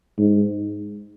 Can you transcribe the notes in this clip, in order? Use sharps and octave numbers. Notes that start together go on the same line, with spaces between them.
G#2